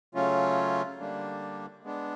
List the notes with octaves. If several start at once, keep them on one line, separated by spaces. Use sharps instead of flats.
C#3 F#3 A3 C#4 F4
D3 G3 A#3 D4
G#3 B3 D4